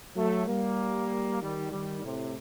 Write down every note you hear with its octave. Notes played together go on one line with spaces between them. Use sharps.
F#3 A3
G3 A#3
D#3 G3
D#3 G3
A2 C3